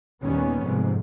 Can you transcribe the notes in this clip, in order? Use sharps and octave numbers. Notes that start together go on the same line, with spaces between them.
D#2 A#2 D#3 G3 B3 C#4
F2 G#2 C3